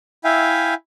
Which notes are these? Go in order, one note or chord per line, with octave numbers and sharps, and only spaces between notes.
E4 E5 F5 G5 G#5